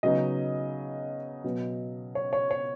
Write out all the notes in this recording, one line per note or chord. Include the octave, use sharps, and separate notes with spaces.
C#3 F#3 B3 D#4 D#5
B2 F#3 B3
C#5
C#5
C#5